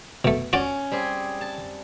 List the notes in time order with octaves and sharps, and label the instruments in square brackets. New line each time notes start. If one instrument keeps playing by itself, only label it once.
[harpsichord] B2 A3
[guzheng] C#4 [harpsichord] F#4 D5
[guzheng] G3 C4 G#4
A5